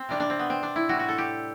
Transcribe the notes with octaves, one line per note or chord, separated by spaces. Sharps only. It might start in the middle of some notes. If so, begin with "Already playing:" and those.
Already playing: C4
C3 G3 D4
D4
C4
B3
C4
D4
E4
A2 G3 F#4
F#4
A4
G4